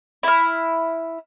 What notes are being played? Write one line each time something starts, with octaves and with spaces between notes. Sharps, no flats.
E4 F6